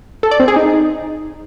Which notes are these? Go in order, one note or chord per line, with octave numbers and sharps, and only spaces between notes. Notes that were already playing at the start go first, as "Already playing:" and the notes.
A4
D5
C4
G#4
D#4